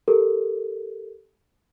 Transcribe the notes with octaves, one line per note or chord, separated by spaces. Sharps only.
G4 A4 A#4